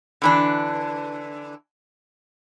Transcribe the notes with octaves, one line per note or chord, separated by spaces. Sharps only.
D3 E3 D4